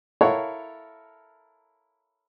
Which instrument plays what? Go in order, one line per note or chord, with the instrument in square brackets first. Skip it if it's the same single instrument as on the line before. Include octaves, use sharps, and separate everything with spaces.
[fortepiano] E4 A4 A#4 C#5 F5 F#5